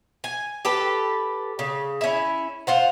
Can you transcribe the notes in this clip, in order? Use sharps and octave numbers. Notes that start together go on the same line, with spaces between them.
G#5
G4 A4 B4
C#3
C#4 E4
F4 C5 F#5